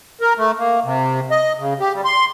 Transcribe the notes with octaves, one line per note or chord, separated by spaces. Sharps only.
A#4
A3
A#3
C3
D#5
C#3
G4
G3
C6